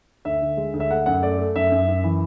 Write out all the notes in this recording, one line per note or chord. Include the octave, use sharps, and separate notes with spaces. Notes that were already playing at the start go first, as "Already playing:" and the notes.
D2 E5
D3
G#3
D2
E5
A3 F#5
F#2 F#5
A3 D5
A3
F#2 E5
F#2
F#2
E3